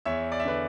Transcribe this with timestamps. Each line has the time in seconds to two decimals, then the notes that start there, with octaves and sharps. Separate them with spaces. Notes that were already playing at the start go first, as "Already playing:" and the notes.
0.05 E2 C#5 E5
0.32 D5
0.40 E5
0.45 D3 B4 D5